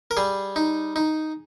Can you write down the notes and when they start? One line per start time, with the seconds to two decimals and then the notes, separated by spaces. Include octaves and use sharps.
0.11 A#4
0.17 G3 G#4
0.56 D#4
0.96 D#4